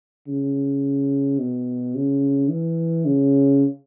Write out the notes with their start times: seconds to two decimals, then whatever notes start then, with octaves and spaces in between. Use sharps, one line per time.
0.27 C#3
1.39 B2
1.95 C#3
2.50 E3
3.06 C#3